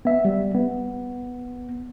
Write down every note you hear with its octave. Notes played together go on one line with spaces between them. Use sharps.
B3 E5
G3
B3